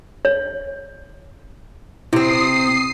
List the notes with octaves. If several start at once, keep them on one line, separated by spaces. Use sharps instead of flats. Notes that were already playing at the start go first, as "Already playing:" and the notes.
C#5
C3 C4 E4 D#6 C7